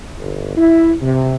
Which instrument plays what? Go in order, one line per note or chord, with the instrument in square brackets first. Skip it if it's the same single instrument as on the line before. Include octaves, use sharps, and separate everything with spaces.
[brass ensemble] G1
E4
C3